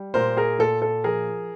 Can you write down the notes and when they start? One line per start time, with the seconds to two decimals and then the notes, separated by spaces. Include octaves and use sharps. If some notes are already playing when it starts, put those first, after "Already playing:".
Already playing: G3
0.14 A#2 A#4 C5
0.37 G#4 A#4
0.59 A#2 A4
0.82 A4
1.04 F3 G#4 A#4